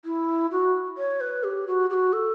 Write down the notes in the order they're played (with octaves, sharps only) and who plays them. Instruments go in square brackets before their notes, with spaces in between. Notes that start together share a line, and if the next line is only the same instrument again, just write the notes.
[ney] E4
F#4
C#5
B4
G4
F#4
G4
F#4
A4